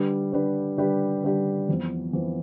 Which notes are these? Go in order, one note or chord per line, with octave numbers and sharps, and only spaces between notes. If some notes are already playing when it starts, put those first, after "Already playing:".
Already playing: D3 G3 D4 G4 B4
D3 G3 D4 G4 B4
D3 G3 D4 G4 B4
D3 G3 D4 G4 B4
F2 E3 B3
F2 E3 B3